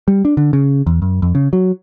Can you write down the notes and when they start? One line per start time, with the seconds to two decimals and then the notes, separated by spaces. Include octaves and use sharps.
0.08 G3
0.25 D4
0.37 D3
0.53 C#3
0.87 E2
1.02 F#2
1.22 F2
1.35 C#3
1.53 F#3